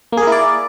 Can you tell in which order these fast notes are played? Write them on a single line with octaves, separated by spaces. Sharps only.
A#3 G#4 A#4 E4 D5